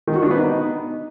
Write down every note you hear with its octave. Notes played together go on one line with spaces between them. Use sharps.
D#3
F#4
D4
B3
D#4